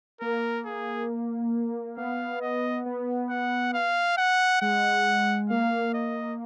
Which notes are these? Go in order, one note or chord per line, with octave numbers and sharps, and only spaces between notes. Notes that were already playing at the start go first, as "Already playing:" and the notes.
A#3 A#4
G#4
B3 F5
D#5
B3
F#5
F5
F#5
G#3 F#5
A#3 F5
D#5